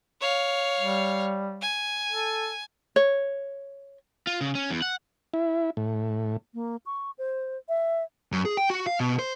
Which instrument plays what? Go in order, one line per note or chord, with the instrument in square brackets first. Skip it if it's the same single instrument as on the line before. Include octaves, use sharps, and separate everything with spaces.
[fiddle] C#5 F5
[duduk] G3
[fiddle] G#5
[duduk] A4
[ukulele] C#5
[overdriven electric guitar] F4
C#3
C#4
E2
F#5
[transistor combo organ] E4
A2
[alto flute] A#3
C#6
C5
E5
[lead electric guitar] F#2
G#4
G5
F#4
F5
B2
C5